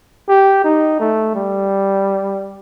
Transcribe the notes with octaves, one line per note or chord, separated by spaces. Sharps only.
G4
D#4
A3
G3